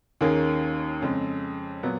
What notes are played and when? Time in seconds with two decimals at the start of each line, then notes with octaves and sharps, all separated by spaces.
0.21 D#2 D#3 A#3 C#4 G#4
1.02 F2 C#3 G#3
1.83 A#2 F#3 B3